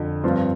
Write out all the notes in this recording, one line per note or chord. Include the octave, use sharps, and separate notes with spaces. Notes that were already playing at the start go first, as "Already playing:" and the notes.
Already playing: F2 D3
G2 F3 C4 F4